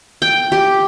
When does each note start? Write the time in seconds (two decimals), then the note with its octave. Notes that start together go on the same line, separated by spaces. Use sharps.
0.22 G5
0.52 G4